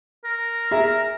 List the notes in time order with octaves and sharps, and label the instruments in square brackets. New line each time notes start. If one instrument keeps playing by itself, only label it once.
[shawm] A#4
[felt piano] G#4 E5 A#5
[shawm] A#4